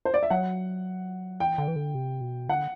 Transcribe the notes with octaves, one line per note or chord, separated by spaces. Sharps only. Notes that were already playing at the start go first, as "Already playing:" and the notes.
C5
D5
E5
F#3 F#5
E3 G5
D3
E3
D3
C3
B2
D3 F#5